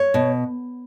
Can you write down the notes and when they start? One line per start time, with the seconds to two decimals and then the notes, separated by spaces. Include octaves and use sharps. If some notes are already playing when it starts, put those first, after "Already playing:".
Already playing: C#5
0.14 B2